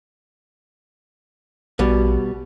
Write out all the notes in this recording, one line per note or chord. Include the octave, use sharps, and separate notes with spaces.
A#1 B2 G3